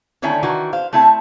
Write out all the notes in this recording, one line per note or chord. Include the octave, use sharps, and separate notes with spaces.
D3 D#3 A3 C#4 E4
D#3 E3 F#4
C5 F5
A3 C4 E4 E5 A5